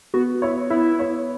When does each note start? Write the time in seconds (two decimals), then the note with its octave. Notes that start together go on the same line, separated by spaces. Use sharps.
0.14 B3 F#4
0.42 E4 C#5
0.70 B3 E4
0.99 C#5